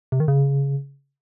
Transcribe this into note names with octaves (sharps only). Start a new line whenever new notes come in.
C3
D#3
C#3